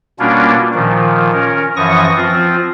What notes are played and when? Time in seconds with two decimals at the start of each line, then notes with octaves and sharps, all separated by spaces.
0.19 B2 G3 A#3 C#4 D4 F4
0.74 A#2 D#3 F3
1.33 C#4 A#4
1.76 F#2 E3 F3 C#6 D#6 A#6
2.16 F3 C4 F4